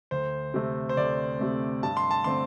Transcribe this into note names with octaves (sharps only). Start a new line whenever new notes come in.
D2 C5
C3 A3 C4
C5
D2 D5
C3 A3 C4
G2 A5
C6
A5
D3 A3 C4 C6